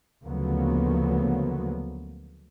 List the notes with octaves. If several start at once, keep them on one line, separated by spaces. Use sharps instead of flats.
D2 C#3 F3 F#3 A#3 B3